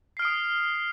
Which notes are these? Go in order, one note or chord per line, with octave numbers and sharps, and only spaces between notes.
D#6 F6 C7 D7